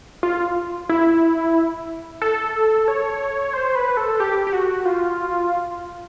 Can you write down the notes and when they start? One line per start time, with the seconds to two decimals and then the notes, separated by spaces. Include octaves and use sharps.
0.23 F4
0.89 E4
2.22 A4
2.88 C#5
3.53 C5
3.75 B4
3.97 A4
4.20 G4
4.47 G4
4.53 F#4
4.85 F4